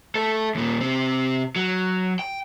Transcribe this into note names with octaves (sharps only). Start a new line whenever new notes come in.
A3 A4
D#2 A#2
C3 C4
F#3
G5